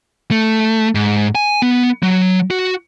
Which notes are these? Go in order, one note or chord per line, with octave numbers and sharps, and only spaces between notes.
A3
G#2
G#5
B3
F#3
F#4